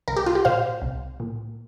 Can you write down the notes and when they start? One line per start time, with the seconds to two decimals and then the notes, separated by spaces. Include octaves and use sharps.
0.08 C2 A#4
0.16 G4
0.26 F4
0.35 G4
0.45 A#2 C5 F5
0.82 C2
1.20 A#2